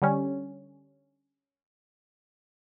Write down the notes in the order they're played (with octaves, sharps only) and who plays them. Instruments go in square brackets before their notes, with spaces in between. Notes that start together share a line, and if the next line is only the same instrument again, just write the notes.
[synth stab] D3 G3 C#4